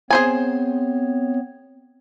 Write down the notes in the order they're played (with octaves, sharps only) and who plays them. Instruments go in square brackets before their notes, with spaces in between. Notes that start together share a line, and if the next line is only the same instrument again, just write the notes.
[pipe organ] B3 C4 C#5 [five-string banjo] G#4 C5 G#5